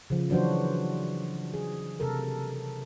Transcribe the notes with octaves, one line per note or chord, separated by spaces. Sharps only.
C#3 F3
E3 F#3 D4 F#4 C5
G#4
C3 A4 A#4